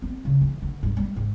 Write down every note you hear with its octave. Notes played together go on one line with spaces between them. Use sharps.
C4
C#3
E3
D3
G2
G3
G#2